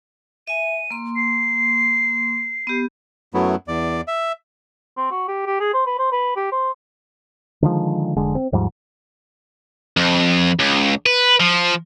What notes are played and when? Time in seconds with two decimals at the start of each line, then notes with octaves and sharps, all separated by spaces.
0.48 E5 G#5 D#7
0.91 A#3 C6
1.16 C7
2.67 B3 G4
3.34 F#2 F#3 A3 B3 E4
3.68 E2 D5
4.08 E5
4.97 C4
5.11 F#4
5.28 G4
5.46 G4
5.60 G#4
5.74 C5
5.86 B4
5.99 C5
6.12 B4
6.36 G4
6.52 C5
7.62 D3 D#3 F3 G#3
8.16 F1 D3 G#3
8.35 C4
8.52 D#2 G#2 F3 G3
9.97 F2
10.60 C#2
11.06 B4
11.40 F3